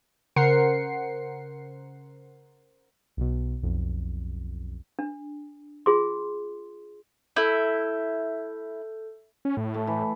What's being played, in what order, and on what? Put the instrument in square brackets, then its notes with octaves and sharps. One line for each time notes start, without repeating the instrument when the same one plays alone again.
[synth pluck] C#3 A#4 C5 F#5 C7 C#7
[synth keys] B1 B2
B1 F2
[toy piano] D4
F4 G#4 C6
[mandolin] E4 [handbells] A4 G6
[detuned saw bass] C#4
A2
[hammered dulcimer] A3
E3